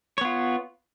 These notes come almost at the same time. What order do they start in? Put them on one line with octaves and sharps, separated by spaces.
C#5 B3 F4